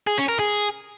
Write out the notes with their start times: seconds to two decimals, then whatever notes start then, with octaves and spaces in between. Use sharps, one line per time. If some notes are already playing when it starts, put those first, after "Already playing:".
0.07 G#4
0.18 C#4
0.29 A#4
0.39 G#4